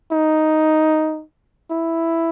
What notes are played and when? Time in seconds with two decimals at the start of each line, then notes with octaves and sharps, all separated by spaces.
0.11 D#4
1.70 E4